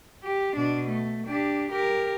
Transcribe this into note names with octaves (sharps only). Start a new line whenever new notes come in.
G4
B2 D4
A3
D4 G4
G4 A#4